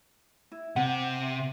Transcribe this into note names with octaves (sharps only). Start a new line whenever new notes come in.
E4
C3 F#5